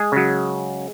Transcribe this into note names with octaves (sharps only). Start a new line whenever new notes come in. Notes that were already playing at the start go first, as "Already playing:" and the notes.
Already playing: G#3 G#4
C#3 F#3